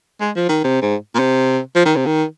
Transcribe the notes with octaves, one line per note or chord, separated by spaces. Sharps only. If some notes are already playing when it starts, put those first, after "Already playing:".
G#3
F3
D#3
C3
G#2
A#2
C3
F3
D#3
C3
D#3